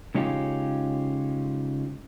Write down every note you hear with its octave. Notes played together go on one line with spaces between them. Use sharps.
C#3 G#3 C#4 D#4 F4 G4